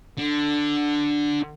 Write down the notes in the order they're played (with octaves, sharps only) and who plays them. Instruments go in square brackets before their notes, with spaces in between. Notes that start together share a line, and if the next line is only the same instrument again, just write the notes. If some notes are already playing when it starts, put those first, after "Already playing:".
[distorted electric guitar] D3